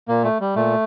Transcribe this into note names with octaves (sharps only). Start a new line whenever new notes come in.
A#2 A#3
A3
G3
A#2 A3